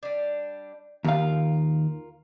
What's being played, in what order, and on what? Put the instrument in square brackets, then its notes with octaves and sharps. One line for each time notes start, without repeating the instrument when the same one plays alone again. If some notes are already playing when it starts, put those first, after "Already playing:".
[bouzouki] G3 D4
[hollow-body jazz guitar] D#2 F5 [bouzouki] F4 A#4